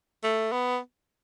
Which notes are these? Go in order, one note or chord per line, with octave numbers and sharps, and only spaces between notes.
A3
B3